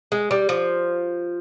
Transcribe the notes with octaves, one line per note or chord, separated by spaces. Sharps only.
G#3
G3
F3